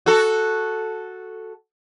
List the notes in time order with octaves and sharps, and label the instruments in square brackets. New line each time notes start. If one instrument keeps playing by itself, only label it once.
[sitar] F#4 A4